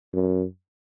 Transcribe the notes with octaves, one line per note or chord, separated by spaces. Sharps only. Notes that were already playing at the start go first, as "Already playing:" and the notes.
F#2